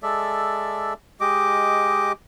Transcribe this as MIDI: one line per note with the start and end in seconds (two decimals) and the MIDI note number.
0.03 0.94 56
0.03 0.94 69
0.03 0.94 74
0.03 0.94 76
1.20 2.12 56
1.20 2.12 67
1.20 2.12 75
1.20 2.12 86